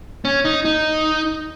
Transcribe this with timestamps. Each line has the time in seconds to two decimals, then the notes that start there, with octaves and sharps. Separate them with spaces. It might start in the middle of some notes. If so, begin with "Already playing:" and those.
0.25 C#4
0.45 D#4
0.65 D#4